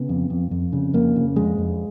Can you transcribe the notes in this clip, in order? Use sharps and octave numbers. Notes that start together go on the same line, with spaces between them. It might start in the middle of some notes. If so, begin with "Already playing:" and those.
Already playing: C#3 B3
F2
F2
F2
C#3
F2 A#3
C#3
F2 G#3
F2